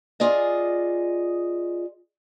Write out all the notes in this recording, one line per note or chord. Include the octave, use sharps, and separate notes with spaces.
F4 G#4 D5 D#5